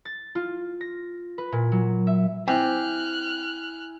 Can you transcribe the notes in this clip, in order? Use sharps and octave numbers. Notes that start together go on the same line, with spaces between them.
A6
F4
A#6
B4
A#2
F#3
E5
C4 E4 G4 G#5 F6 F#6